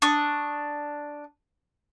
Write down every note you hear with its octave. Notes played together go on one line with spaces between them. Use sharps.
D4 C#6 D#6